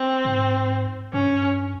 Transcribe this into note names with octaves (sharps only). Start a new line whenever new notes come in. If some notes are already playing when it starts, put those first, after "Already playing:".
Already playing: C4
G#2
G2 C#4